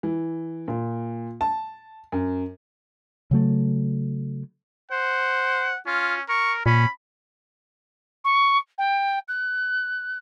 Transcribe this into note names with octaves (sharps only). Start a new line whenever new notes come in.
E3
A#2
A5
F#2
C#3 F#3 A3
C5 F#5
C#4 F4
A#4 C#6
A#2 C#4 B5
C#6
G5
F#6